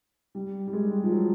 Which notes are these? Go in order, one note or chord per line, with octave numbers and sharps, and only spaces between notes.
G3
G3
G#3
F3
F#3